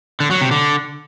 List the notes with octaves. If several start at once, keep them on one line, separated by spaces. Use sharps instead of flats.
D3
F#3
C3
D3